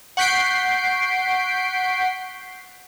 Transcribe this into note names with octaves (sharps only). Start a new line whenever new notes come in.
F#5 C#6 G6 B6 C7 D7